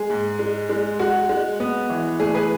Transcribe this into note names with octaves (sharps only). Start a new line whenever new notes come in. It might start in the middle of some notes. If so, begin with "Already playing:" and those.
Already playing: G#3 G#4
G#2
G#3
G#3
G#3 F#4
G#3
B3
E3
A3 G#4
G#4 B4